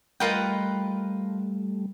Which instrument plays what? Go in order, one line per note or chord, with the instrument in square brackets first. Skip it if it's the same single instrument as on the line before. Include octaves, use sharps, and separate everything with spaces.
[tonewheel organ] G3 A3 [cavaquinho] F4 A#4 G5 [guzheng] B4 D#5 F#5